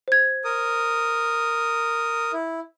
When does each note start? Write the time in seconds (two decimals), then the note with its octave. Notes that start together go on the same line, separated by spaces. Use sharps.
0.08 C5 G#6
0.45 A#4 D#6
2.33 E4